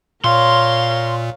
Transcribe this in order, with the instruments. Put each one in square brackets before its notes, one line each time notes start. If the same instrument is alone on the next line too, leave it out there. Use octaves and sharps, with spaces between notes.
[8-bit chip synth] A#2 [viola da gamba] A#4 C#5 [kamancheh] F5 [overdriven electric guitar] C6